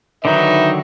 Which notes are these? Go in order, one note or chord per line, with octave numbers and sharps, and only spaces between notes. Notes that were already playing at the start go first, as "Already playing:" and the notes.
D3 D#3 F#3 D#4 B4 E5